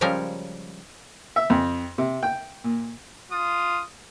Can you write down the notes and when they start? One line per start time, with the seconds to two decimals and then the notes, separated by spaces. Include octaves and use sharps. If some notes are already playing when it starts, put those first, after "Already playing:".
0.01 C#3 F3 G3 G#3 C#4 A#4
1.36 E5
1.50 F2
1.98 C3
2.23 G5
2.64 A#2
3.32 F4 D#6